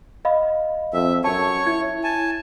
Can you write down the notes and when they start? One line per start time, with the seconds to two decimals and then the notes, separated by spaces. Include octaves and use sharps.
0.25 D#5 F5 B5
0.93 F2 E5
1.24 F#2 C#5 A5 C#6
1.67 E4 G#6
2.04 G#5 A5